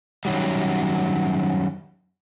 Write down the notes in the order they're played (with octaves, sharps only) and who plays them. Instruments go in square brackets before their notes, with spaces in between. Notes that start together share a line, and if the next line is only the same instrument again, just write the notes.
[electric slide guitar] F#2 D#3 F#3 G3